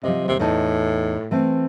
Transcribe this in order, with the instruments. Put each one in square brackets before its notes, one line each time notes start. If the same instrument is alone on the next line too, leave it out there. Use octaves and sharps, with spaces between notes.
[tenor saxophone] C3 [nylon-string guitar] F3 D#5
[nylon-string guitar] D#2 [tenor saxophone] C3
[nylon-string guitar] E2 D#4 A5 [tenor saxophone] A2
[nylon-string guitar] E3 A3 C4